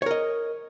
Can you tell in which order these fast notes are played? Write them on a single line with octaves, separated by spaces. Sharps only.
C#5 A#4 D#5